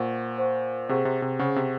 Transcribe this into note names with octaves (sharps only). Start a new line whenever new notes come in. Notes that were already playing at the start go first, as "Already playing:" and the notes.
Already playing: A#2 C5 F#5 C#6
C5 F#5 C#6
C3 G#4 C5 F#5 C#6
C3
C3
C#3 G#4 C5 F#5 C#6
C3